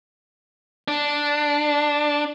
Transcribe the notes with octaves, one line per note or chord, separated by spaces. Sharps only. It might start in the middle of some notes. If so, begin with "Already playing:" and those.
D4